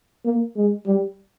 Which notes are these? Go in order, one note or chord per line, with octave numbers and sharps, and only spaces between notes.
A#3
G#3
G3